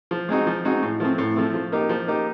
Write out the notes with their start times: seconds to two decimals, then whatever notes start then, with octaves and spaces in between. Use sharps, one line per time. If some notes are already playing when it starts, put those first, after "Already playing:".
0.11 F3
0.29 G#3 C4 D#4 F#4
0.47 F3
0.64 G#3 C4 D#4 F#4
0.82 A2
1.00 F3 A3 C4
1.18 A2
1.36 F3 A3 C4
1.54 F3
1.72 A#3 D#4 G4
1.89 F3
2.07 A#3 D#4 G4